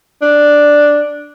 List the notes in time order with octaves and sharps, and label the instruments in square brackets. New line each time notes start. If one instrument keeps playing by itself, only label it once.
[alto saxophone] D4